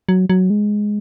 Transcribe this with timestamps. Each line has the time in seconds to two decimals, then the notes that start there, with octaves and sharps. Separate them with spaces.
0.09 F#3
0.30 F#3
0.50 G#3